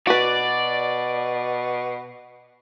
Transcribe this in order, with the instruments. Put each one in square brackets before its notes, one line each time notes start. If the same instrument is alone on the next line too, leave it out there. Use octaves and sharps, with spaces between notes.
[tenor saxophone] B2 [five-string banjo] F#4 B4 [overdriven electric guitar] D5